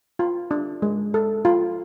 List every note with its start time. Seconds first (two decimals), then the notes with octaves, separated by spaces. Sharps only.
0.19 F4
0.51 D4
0.82 G#3
1.14 A4
1.45 F4